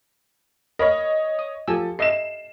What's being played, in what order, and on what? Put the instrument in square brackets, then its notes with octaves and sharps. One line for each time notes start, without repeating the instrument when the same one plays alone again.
[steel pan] A#4 B5 [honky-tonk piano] C#5 D#5
[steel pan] D#6
[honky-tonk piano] F3 A4 [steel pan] G4 G#5 E6
[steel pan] A4 D#5 E5 [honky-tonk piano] C7 E7